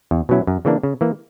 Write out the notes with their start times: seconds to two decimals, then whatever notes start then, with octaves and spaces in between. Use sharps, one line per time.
0.11 E2
0.29 B2 F#3 C#4 E4
0.47 F#2
0.65 C#3 E3 A#3 D4
0.83 C#3
1.01 E3 A#3